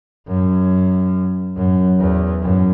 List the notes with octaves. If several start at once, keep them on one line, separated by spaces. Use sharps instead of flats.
F#2
F#2
E2
F#2